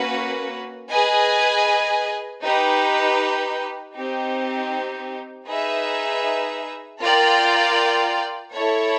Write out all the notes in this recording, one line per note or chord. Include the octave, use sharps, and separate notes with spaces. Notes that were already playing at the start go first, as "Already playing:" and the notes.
Already playing: A#3 C#4 F#4 B4
G#4 B4 D#5 G#5
D#4 G4 B4
C4 D#4 G4
D#4 G#4 B4 E5
F4 A#4 D5 G5
E4 A4 C#5